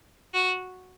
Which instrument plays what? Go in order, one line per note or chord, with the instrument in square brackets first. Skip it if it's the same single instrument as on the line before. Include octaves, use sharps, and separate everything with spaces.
[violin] F#4